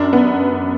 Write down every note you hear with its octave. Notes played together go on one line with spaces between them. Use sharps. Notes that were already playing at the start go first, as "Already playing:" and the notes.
Already playing: F#2 D4
B3